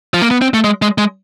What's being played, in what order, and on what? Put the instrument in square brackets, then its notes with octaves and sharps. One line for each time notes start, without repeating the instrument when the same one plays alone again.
[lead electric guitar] F3
A#3
B3
C4
A3
G#3
G#3
G#3